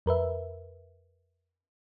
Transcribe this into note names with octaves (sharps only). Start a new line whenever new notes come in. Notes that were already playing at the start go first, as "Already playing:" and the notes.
F2 A#4 B4 E5